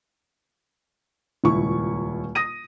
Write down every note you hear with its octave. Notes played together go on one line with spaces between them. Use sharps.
D#1 C#2 E4 C#6
D#6 A#6 D#7